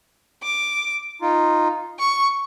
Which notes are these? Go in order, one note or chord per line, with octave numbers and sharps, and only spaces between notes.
D6
D#4 F4
C#6